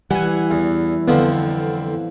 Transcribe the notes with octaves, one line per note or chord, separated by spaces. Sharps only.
E3 G3 F#5 G#5
E2
F2 D3 F3 B3